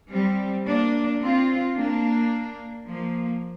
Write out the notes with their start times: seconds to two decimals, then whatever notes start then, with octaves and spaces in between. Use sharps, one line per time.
0.11 G3 C4
0.67 A#3 D4
1.22 C4 F4
1.77 A#3 D4
2.88 F3 A#3